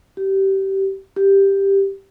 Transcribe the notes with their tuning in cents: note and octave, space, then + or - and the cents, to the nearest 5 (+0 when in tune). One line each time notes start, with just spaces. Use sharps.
G4 -20
G4 +5